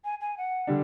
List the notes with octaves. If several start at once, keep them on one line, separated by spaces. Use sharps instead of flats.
G#5
G#5
F#5
D3 G3 D4